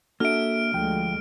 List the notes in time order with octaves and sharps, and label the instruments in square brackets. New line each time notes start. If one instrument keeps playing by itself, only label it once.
[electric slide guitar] A#3 E5 [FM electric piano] D4 F#4 A4 [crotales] F6 D7
[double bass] D2 G#3 [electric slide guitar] F3 G5